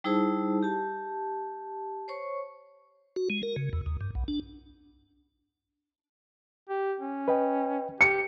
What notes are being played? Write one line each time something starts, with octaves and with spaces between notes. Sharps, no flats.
G3 D#4 E4 G#4 C5 A5
G4 A5
C5 C#5 C#6
F#4
G#3
A#4
C#3
E2
D#2
G2
B1
D4
G4
C#4
B4 D#5 G5
G4 C#7